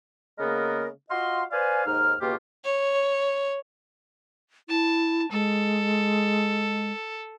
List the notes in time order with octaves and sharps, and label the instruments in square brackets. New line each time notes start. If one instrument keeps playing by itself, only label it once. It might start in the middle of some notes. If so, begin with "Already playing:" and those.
[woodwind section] C#3 G#3 A#3 B3 A#4
F4 F#4 D#5 F5 C6
B4 C5 D5 F5 G#5
D#2 G#2 D#4 F6
C#2 B2 A#3 F4 G4
[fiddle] C#5
[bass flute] E4 [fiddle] A5
[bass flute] G#3 [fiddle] A4